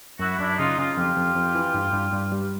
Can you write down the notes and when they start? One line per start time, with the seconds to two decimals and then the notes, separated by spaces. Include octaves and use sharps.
0.19 F#2 E4 F#4
0.39 F#2 D4 E4
0.58 C#3 D#4 F4
0.78 C#3 D#4 F4
0.97 F2 F4 G4
1.16 F2
1.35 F2
1.55 E3
1.74 G2
1.93 G2
2.12 G2
2.32 G3